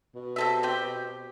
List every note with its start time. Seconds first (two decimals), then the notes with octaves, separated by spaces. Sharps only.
0.15 B2
0.36 C3 A4 E5
0.63 C4 G4